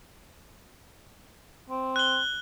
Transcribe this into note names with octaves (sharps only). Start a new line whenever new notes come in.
C4
F#6 G7